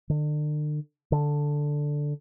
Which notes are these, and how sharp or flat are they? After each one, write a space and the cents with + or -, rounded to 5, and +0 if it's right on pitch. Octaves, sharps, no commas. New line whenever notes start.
D3 +35
D3 +0